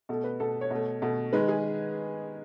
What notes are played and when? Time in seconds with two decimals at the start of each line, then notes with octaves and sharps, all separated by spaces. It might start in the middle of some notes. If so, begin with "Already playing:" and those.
0.09 B2 A3 A4
0.24 B4
0.40 B2 A3 A4
0.61 C#5
0.70 B2 A3
1.02 B2 A3
1.33 D#3 G#3 B4
1.48 G#4